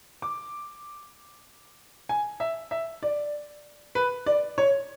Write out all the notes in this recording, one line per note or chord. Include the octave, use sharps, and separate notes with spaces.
D6
G#5
E5
E5
D5
B4
D5
C#5